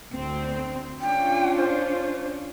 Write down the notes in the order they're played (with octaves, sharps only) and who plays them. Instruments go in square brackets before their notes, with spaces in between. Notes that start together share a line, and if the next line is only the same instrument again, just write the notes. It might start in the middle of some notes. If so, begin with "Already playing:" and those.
[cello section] D2 C4
[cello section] C#4 D4 F4 [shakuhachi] G5
[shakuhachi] C5